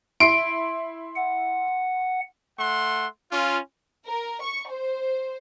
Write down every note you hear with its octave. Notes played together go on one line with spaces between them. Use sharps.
E4 C6 C7 D7
F#5
A3 F#5 C6
C#4 F4
A#4
C#6
C5